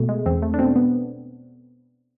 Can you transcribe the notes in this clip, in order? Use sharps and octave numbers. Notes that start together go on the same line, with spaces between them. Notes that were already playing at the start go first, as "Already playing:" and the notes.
Already playing: B2 A3
G#3
E2 C4
A3
D4
B2 C4
B3